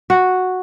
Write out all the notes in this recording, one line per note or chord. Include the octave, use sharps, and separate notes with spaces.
F#4